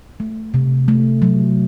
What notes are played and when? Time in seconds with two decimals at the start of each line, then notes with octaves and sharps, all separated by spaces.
0.20 A3
0.54 C3
0.88 A3
1.22 F#3